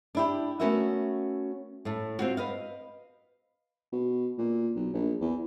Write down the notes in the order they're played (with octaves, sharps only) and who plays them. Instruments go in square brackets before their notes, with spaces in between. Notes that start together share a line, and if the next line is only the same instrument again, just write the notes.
[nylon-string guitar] D4 E4 G4
A3 B3 C#4 F#4 A#4 E5
A2 A3
C4 F4 F#4
B4 D#5 F5
[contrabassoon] B2
A#2
B1
A#1
E2